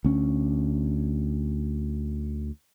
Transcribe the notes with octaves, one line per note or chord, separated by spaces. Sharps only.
D2 C#4